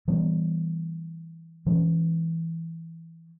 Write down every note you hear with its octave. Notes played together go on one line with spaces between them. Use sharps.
E3 G3 B3
E3 G#3 C#4